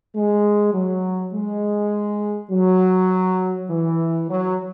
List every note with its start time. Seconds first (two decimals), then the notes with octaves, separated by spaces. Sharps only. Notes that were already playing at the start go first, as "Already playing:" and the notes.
0.16 G#3
0.74 F#3
1.34 G#3
2.51 F#3
3.70 E3
4.30 F#3